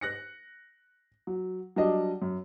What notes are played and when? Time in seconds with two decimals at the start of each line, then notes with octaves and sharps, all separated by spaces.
0.01 F#6 A#6 C#7
1.27 F#3
1.76 F#3 G3 D4 D#5
2.22 F#2